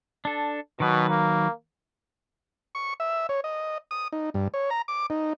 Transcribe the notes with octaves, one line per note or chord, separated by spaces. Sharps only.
D4 A4
B2 D#3 F#3 B4
A#3
C#6
E5
C#5
D#5
D#6
D#4
G2
C#5
A#5
D6
D#4